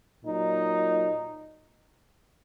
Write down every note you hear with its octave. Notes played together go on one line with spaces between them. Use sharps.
A#2 F#3 D#4